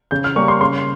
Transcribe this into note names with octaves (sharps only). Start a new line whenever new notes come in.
C#3 G6
F6
G3 A#3 C#4 C#6
C6
C#3 C6